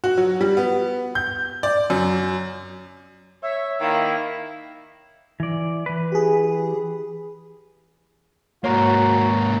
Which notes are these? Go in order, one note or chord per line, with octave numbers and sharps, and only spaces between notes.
F#4
F#3
G3
B3
G6
D5
F#2
C#5 E5
D#3 A#3 E4 F5
E3 D5
E3 B4
G4 G#4
G#2 A#3 F#4 C#5 A#5